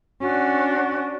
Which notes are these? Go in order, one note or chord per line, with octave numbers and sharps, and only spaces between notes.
C#4 D4 F#4